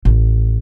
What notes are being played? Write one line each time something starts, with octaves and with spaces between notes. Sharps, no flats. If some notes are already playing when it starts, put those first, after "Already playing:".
A1